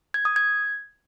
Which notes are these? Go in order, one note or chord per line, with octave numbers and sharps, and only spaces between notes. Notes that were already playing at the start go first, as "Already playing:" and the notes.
G#6
D#6
G#6